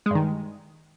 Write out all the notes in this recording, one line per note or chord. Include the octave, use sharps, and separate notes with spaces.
G2 D#3 G#3